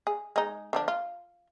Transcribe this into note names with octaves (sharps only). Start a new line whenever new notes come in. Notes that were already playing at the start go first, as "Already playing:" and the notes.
G#4
G#3 D#4
D3 F3 D4
F4